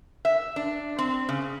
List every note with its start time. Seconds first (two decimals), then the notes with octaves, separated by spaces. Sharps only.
0.25 E5
0.56 D4
0.99 C4
1.29 C#3